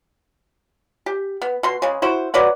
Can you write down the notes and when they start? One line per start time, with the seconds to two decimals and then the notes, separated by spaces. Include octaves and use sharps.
1.06 G4
1.42 B3
1.63 B2 C6
1.82 C#3 G#3
2.02 E4 F#4 C5
2.34 F#3 B4 D5 F#5